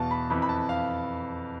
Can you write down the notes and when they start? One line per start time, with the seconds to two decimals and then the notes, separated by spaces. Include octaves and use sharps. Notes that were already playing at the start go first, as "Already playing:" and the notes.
Already playing: E2 B2 F5 A5
0.11 B5
0.30 F2 E3 B5
0.42 B5
0.49 A5
0.69 F5